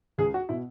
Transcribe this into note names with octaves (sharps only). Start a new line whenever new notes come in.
C#2 G#4
F#4
B2 E4